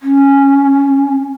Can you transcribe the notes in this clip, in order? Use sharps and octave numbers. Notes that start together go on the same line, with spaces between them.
C#4